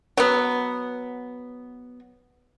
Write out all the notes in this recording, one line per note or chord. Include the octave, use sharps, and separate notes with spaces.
F#3 B3